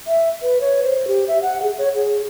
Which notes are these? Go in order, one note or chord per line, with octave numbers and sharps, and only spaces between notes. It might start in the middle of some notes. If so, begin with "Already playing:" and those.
E5
B4
C#5
C5
G4
E5
F#5
G#4
C#5
G#4